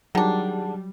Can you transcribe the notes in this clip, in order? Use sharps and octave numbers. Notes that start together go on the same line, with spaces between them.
D#3 F#3 G3 D4 G#4 F#5 A5